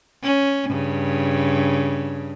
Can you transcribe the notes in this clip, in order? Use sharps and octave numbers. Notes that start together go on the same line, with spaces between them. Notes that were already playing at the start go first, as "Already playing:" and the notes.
C#4
G2 C#3